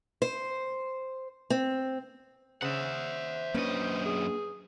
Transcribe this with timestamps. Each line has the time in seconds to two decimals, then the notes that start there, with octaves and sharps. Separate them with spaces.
0.22 C5
1.50 C4
2.62 C#3 C5 E5 F#5
3.54 F#2 A#3 C#4 D4 B4 D#5
4.06 G#4